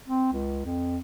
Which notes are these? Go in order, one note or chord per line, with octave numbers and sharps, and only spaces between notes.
C4
C#2
F2